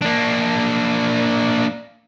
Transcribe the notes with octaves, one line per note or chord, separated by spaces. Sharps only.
A#3 D4